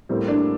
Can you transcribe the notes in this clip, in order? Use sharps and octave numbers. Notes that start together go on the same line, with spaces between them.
A2 G3 A#3 C4
D4